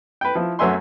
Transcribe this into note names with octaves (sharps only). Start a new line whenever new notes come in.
B4 G5
F3 E4
F#2 F#3 A3 E5 G#5 C6